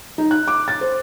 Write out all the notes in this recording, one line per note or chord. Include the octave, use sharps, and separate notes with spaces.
D#4
F#6
D6
A6
C5